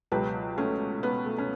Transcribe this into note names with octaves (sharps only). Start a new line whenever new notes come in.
C#2 B2 F#3 G4 B4
A3 C#4
B3
A3
C#4